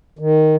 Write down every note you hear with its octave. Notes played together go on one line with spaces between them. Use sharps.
D#3